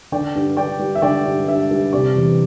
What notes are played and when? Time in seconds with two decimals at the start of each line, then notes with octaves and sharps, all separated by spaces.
0.12 D3 D5 G5
0.35 G2
0.57 G2 D5 G5
0.79 G3
0.95 E5
1.02 D3 D5 G5
1.26 G2
1.48 G2 E5
1.71 G3
1.93 C3 D5
2.15 E2